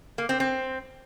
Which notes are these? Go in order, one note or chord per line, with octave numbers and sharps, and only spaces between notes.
A#3
C4
C4